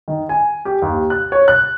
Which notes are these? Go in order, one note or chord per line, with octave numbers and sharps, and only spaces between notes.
D#3
G#5
G4
D#2
F#6
C#5
F#6